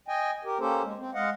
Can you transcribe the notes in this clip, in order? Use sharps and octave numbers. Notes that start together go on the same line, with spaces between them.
D#5 G5 G#5
G4 A#4
A#3 C#4 G4 A4 C5
G#3
C4
G#3 D#5 F5 F#5